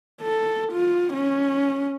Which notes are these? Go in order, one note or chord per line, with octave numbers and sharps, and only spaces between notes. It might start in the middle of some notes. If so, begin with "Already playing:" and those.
A4
F4
C#4